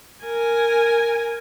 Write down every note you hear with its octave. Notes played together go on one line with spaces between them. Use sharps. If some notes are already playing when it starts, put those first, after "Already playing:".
A#4 G#5